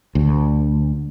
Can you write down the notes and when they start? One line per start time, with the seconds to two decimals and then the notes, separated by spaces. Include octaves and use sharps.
0.15 D2